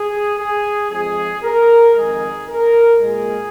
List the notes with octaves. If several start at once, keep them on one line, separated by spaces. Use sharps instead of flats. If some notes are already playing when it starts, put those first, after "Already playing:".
Already playing: G#4
G#4
F2 F3 G#3 G#4
A#4
F2 D#3 G#3 G#4
A#4
A#2 G#3 G#4